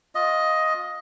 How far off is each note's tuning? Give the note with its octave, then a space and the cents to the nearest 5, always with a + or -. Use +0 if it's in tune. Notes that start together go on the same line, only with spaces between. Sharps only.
F4 +25 D#5 +10